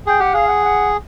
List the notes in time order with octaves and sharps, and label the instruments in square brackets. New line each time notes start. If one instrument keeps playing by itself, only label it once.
[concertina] G#4 [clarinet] G5
[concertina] G4 [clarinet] F#5
[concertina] G#4 [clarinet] F5
[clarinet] F#5
F#5